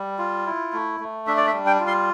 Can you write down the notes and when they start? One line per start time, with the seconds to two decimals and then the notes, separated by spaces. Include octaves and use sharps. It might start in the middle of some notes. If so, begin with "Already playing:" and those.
Already playing: G3
0.19 F4
0.46 E4
0.73 A3
1.00 A3
1.27 D4 E5
1.37 D5
1.47 E5
1.53 G3
1.66 G5
1.80 F4
1.87 C6